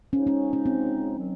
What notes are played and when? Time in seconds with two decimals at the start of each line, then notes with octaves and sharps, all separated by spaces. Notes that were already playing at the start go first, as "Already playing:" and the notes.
0.13 C#3 F3 G#3 C#4 D#4
0.27 C#4
0.53 C#4
0.66 C4
1.18 D#3 F#3